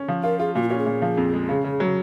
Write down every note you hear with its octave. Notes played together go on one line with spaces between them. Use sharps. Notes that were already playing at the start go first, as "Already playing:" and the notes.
Already playing: C#4
F3
F4 A#4
F4 G#4
A#2 F#4
F4
C#4 F#4
G#4
A#2
F3
F2
G#3
C#3
C#3
F#3